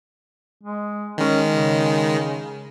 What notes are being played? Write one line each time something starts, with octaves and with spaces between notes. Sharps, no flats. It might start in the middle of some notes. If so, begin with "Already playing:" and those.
G#3
D#3 G#3 C#4
C#3